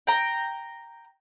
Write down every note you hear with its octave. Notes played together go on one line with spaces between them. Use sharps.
G5 A#5